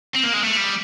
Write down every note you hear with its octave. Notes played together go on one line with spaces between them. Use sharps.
C4
A#3
G#3
A3
G3